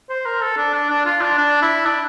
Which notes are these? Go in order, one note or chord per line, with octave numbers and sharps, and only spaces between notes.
C5
A#4
A4
D4
D4
D4
F4
D4
D4
E4
D4